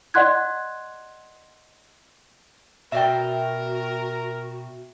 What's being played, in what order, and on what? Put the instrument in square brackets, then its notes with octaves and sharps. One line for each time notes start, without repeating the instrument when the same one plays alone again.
[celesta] D5 D#5 F#5 C6 F#6 G#6
[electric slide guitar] B2 D5 [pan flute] F#4 [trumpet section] A#4 [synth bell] E5 G5